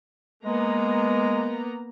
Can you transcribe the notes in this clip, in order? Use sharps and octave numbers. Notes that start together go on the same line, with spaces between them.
G#3 A#3 B3 A#5